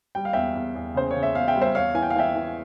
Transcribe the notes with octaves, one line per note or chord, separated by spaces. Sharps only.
G3 G5
F5
E2 E5 G5
E2
E2
C#3 C5
C#5
C#3
E5
E2 F5
E5 G5
G3
C5 E5
E2 C#5 F5
E3 G#5
G5
F5
E3 E5 G5
E3